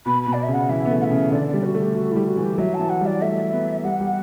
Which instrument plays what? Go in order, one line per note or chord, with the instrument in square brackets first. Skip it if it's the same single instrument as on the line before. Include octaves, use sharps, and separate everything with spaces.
[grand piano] B2 [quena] B5
[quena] B5
[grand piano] B2
[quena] D5
E5
[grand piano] C#3 [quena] F#5
[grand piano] E3 [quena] E5
[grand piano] B3
A3
[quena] F#5
E5
[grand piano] C#3
[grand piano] D3 [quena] D5
[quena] D5
[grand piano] G3
[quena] F#4
[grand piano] A3
[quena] G4
[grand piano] A3 [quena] F#4
[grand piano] G3 [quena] E4
[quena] F#4
[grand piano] E3
[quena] G4
[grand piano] F#3 [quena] E5
[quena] A5
[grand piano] E3
[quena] F#5
[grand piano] G3
[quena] D5
[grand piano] A3 [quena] E5
[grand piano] B3
[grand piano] G3 [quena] F#5
[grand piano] G3